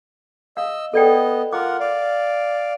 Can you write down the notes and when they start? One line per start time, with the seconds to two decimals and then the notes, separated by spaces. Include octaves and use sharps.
0.57 D#5 F5 E6
0.94 B3 A4 D5 D#5 G5
1.53 F4 A#4 F#5 D6
1.80 D5 F5